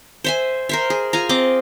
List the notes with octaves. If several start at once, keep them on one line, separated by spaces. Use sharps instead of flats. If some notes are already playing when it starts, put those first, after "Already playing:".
C5 E5 G#5
A#4 C5 E5
G#4
F4 G#5 A#5
C4 D#5 D6